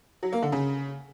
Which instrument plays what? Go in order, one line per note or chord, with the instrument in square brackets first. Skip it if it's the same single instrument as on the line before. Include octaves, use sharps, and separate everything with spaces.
[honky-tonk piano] F#3
A#3
D3
C#3